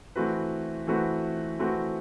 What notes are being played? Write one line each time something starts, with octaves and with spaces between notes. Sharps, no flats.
E3 A3 C4 F#4 B4
E3 A3 C4 F#4 B4
E3 A3 C4 F#4 B4